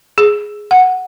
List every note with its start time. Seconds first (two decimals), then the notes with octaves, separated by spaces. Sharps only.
0.18 G#4
0.71 F#5